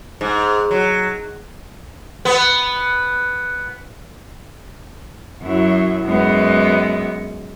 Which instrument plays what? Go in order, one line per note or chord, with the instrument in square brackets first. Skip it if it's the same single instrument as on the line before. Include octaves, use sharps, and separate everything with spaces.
[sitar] G#2
F#3
B3
[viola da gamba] F#2 F#3 E4
F#2 G#3 B3